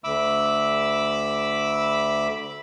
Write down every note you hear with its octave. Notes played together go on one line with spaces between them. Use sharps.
D2 E5 B5 D6 E6